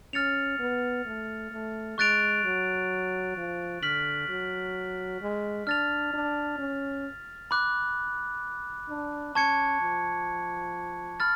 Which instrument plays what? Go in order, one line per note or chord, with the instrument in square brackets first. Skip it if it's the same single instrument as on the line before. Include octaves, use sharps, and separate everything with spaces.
[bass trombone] C#4 [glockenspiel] F6 A6 C#7 F7
[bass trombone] B3
A3
A3
[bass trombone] G#3 [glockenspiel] C#6 F#6 A6 D7 F7
[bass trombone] F#3
F3
[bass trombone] D3 [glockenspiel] F6 B6 F#7
[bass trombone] F#3
G#3
[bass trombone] D4 [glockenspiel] F6 A6 F7
[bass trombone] D4
C#4
[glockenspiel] B5 D6 F#6
[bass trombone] D4
[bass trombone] C#4 [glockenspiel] A5 C#6 G#6 C#7
[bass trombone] F3
[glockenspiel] B5 F6 A6